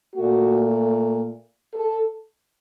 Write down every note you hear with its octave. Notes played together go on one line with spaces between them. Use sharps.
A#2 A3 F#4
A4